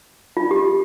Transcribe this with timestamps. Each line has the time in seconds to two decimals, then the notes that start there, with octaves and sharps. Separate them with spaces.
0.37 F4
0.51 G4